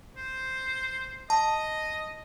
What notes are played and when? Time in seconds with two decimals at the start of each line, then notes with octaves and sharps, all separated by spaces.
0.17 C5
1.30 D#5 A5